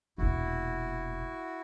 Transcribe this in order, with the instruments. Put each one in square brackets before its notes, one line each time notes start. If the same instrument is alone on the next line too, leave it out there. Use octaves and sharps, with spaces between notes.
[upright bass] E1 A#2 [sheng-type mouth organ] E4 F#4